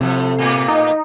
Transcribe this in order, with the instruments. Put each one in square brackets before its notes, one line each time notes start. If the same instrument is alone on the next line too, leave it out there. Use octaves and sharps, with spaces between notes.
[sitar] A2 F3 [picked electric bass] C3
[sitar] A2 A#3 B3
[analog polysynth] D#4